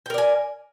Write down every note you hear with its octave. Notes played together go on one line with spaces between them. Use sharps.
A#4 D5 G5 G#5